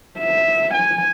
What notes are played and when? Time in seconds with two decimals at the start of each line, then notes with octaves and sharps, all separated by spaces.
0.19 E5
0.74 G#5